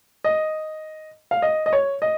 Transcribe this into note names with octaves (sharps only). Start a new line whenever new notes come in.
D#5
F5
D#5
D#5
C#5
D#5